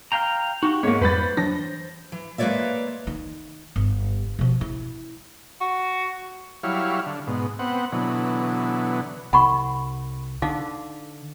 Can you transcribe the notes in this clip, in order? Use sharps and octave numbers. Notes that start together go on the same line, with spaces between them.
F5 G5 A#5
D#4 F#4 G4
G#2 A#3 C#5
F2 G3 B4 C5 B5 A6
E3 F#3 D4 A#6
E3
G#3 A#3 B4 C#5 D5 E5
D#3
G1
B2 F3
E4
F#4
F#3 G3 E4 C#5 F5
D3
G#2 B2
B3 C4 F#5
B2 D3 E3 F#3
C2 F#5 B5 C#6
D3 D#4 F5 D6